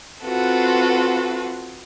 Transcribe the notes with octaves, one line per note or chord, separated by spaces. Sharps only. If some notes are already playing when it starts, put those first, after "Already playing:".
C4 F4 F#4 A4 B4